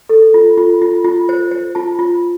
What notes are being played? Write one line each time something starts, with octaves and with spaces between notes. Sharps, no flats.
A4
F4
F4
F4
F4
C5
C5
F4 A5
F4